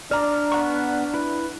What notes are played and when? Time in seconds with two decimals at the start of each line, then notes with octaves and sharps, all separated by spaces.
0.11 D4 D5 A#5 F6
0.52 B3 F#5 C#6
1.14 E4 B4